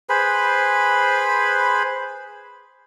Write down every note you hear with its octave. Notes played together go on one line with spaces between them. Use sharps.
G#4 B4 C5 B5